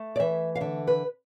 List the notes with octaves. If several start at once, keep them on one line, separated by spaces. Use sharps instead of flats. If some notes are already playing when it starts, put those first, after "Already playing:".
Already playing: A3
D5
E3 E5
F5
D3 E5
B4